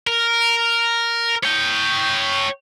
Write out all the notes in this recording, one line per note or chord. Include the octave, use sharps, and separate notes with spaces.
A#4
C#5 G5